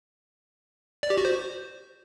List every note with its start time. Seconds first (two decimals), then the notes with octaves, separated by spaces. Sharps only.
1.03 D5
1.10 G4
1.17 F#4
1.25 C5